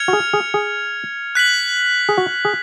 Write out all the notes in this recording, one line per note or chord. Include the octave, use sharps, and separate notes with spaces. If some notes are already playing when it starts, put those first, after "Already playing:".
Already playing: F6 G#6 C#7 F7
F#4
G#4
G#4
G#4
F#6 B6 F#7
G#4
F#4
G#4